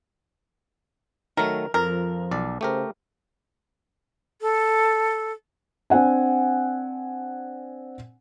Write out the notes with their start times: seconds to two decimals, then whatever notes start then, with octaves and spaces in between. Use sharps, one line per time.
1.37 D#3 F#3 A3 A#4
1.74 F2 F3 A#4
2.31 B1 D5
2.61 C#3 A3 G4 A#4 C5
4.41 A4
5.90 C4 D4 F#5 G#5